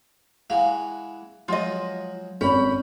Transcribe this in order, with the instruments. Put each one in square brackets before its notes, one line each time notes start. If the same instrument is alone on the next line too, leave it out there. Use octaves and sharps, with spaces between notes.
[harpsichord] E3 G#3 F#4 [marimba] F5 G#5
[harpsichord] F3 F#3 G#3 [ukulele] F4 D#5
[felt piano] G#1 [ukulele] C#4 [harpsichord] G5 B5